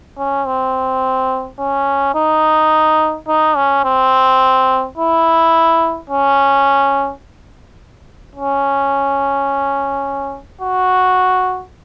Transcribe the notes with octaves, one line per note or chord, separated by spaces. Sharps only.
C#4
C4
C#4
D#4
D#4
C#4
C4
E4
C#4
C#4
F#4